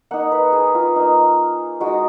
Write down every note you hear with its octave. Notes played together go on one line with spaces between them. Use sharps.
A#3 D#4 F#5
B4
G#4
F4
A#3 D#4
G#3 D#4 F#4